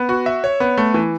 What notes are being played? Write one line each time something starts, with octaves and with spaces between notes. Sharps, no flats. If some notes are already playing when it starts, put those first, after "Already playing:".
Already playing: B3
F#4
E5
C#5
B3
A3
E3